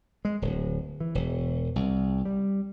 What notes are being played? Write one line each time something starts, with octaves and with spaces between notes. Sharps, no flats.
G#3
D1
E3
E1
C2
G3